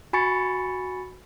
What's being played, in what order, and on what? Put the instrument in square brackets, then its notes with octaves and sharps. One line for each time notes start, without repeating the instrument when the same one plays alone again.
[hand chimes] F#4 G#5 B5 C#6 A6 C#7